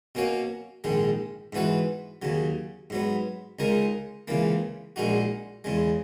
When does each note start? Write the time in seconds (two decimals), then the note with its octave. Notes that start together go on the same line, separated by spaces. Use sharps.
0.15 B2 A#3 C#4 F#4 C#5
0.84 A#1 G#2 D#3 G#3
1.53 G#2 E3 B3 F#4 B4
2.22 D#2 C#3 F#3
2.90 G#2 F#3 B3
3.59 C#2 C#3 G#3 D#4 A#4
4.28 C#2 C#3 E3 A#3
4.96 A#1 A#2 G#3 D#4 F#4
5.64 E2 C#3 G#3